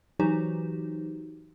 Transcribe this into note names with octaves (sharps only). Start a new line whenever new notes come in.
E3 F#3 D#4 F#4 G4 C5